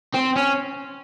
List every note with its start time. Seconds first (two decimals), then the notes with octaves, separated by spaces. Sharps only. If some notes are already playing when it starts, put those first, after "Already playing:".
0.15 C4
0.36 C#4